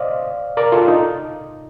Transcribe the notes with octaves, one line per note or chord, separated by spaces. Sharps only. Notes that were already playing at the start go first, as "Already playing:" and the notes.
Already playing: C5 D5 D#5 F5
A#4 D5
F4 A4
D#4